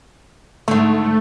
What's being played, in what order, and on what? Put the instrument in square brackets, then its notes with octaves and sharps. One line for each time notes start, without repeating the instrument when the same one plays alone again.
[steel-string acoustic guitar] G#2 D3 [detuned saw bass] A3